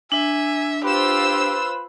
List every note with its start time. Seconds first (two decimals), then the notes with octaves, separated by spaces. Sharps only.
0.12 D4 E5 G#5
0.84 F4 G4 B4 C5 E6